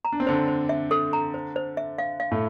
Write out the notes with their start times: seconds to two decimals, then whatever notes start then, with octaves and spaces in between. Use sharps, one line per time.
0.05 A#5
0.12 D4
0.20 C4
0.27 D3 D4 C5
0.48 C5
0.69 E5
0.91 A4
1.13 A#5
1.34 C5
1.56 C5
1.77 E5
1.98 F5
2.20 F5
2.31 A2 A3